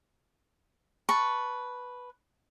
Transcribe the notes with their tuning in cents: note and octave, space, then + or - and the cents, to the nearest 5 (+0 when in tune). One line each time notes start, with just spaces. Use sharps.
B4 +0 A5 +0 C#6 +0